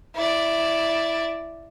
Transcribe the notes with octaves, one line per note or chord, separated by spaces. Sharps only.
E4 D5